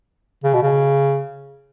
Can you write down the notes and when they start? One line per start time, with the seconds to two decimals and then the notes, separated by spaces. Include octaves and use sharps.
0.44 C#3
0.54 B2
0.63 C#3